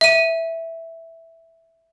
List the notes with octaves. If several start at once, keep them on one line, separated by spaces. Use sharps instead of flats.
E5 D#7